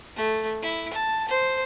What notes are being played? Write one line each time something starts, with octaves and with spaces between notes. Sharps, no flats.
A3
E4
A5
C5